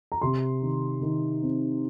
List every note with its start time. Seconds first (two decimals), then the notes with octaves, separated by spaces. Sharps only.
0.12 A#5
0.22 C3 C6
0.62 D#3
1.02 D#3
1.42 C4